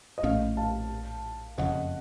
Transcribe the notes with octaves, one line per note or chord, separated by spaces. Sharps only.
D#5
A#1 A2 A3 C#4 F5
F5 A5
F#1 F2 C#3 D#5 F#5